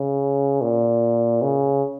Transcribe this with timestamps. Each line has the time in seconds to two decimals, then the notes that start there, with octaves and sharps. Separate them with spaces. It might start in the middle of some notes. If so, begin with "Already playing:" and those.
Already playing: C#3
0.61 A#2
1.42 C#3